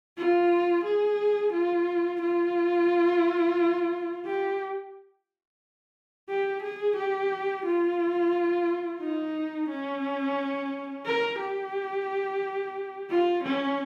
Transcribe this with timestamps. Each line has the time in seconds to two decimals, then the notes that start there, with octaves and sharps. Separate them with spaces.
0.18 F4
0.84 G#4
1.53 F4
2.22 F4
4.26 G4
6.30 G4
6.63 G#4
6.97 G4
7.65 F4
9.01 D#4
9.69 C#4
11.06 A#4
11.39 G4
13.10 F4
13.44 C#4